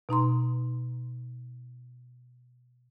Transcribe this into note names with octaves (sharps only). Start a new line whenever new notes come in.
B2 D#4 A#5 C6